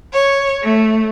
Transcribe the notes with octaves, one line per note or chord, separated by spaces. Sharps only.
C#5
A3